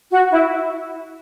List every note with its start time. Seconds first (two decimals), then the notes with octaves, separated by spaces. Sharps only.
0.11 F#4
0.31 E4